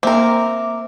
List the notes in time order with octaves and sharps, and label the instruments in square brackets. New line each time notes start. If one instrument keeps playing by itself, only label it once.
[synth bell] A#3 E5 D6 [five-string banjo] C4 A#4